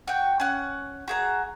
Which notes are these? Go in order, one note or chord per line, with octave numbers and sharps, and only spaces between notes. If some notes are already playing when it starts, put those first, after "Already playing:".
F#4 G5
C#4 F#5
F#4 G#4 A#5